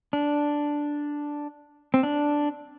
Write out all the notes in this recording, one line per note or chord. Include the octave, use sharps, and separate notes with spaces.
D4
C4
D4